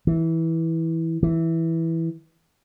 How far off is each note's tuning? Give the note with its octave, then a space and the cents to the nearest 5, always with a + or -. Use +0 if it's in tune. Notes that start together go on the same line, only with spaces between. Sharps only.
E3 -15
E3 -5